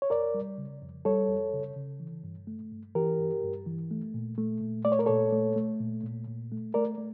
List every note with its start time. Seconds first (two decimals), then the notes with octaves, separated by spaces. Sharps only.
0.02 C#5
0.10 F2 A#4 D5
0.34 G3
0.58 C#3
0.82 F2
1.05 G3 A4 C#5
1.29 F2
1.53 C#3
1.76 C#3
2.00 E3
2.24 G2
2.47 A3
2.71 G2
2.95 E3 G4 A#4
3.19 G2
3.43 G2
3.66 E3
3.91 A3
4.14 A#2
4.38 A3
4.61 A#2
4.85 A3 D5
4.92 C#5
4.99 A#4
5.06 A#2 A4 C#5
5.32 A3
5.56 A3
5.80 A#2
6.04 A#2
6.27 A#2
6.52 A3
6.74 A3 A#4 D5
6.98 A3